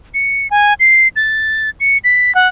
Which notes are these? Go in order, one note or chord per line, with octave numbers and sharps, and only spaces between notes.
C#7
G#5
C7
A6
C#7
B6
F#5